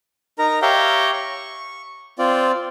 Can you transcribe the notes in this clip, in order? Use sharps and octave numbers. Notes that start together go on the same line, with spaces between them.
D#4 A#4 A#5
G4 C#5 E5 F5 G5 A#5
C#6
C4 F4 D5